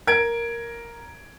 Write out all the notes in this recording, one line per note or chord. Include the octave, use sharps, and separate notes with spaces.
A#4 G#6 D7